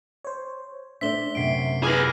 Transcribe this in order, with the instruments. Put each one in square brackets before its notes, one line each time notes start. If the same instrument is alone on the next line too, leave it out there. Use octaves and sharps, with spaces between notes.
[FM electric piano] C5 C#5
[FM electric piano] A3 C5 E5 [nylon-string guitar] D4 D5 [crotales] B6 G7
[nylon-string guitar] F#2 C3 [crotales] C7 D7
[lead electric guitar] G#4 B4 [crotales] D6 F6 A#6